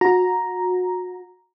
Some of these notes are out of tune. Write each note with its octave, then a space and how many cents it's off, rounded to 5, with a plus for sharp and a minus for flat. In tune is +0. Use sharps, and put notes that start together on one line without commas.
F#4 -30 A#5 +0